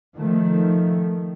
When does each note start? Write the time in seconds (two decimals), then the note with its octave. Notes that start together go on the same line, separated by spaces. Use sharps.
0.17 D#3 F3 A3